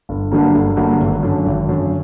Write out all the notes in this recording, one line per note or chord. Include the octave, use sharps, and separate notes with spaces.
G1
G2 D3 F#3 A#3
G1
G2 D3 F#3 A#3
G#1
F#2 D3
G#1
F#2 D3